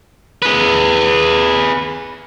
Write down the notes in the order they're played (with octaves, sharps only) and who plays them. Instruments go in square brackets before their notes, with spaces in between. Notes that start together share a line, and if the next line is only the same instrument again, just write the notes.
[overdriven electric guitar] G#4 B4